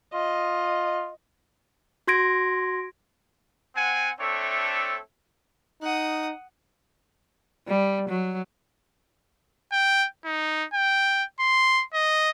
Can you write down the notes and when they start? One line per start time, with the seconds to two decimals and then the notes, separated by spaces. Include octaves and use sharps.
0.14 F4 D#5
2.07 F#4 C6 G#6 A#6 D7
3.76 C4 F#5 G#5
4.20 A3 C4 D4 A4 C#5 E5
5.82 D#4 F#5 D#6
7.68 G3
8.09 F#3
9.72 G5
10.25 D#4
10.74 G5
11.40 C6
11.94 D#5